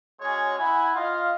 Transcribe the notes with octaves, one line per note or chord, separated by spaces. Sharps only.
G#3 C#4 F#4 G#4 C#5
E4 F#5 G#5
F4 D#5 F5